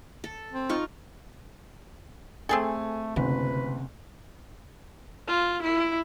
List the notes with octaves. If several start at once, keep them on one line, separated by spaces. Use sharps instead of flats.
A4
C4
D#4 F4 C#6
A3 C4 G#4 A4 G#5
F#1 D2 C3 B4
F4
E4